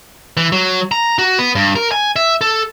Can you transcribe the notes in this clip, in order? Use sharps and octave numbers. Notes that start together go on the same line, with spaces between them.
E3
F#3
A#5
F#4
B3
G2
A#4
G#5
E5
A4